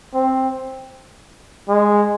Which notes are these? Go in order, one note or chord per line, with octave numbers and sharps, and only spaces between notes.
C4
G#3